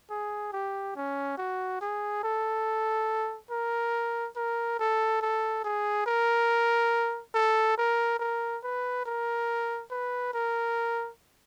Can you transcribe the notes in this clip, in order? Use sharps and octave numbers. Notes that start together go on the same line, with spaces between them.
G#4
G4
C#4
F#4
G#4
A4
A#4
A#4
A4
A4
G#4
A#4
A4
A#4
A#4
B4
A#4
B4
A#4